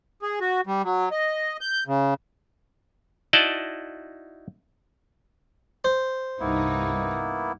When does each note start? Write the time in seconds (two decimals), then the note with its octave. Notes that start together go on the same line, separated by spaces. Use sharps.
0.22 G#4
0.41 F#4
0.67 G3
0.84 F#3
1.11 D#5
1.61 G6
1.87 C#3
3.33 D#4 E4 F#4 D5 D#5 A5
5.85 C5
6.40 C2 G2 A#3 B3 D#4 E4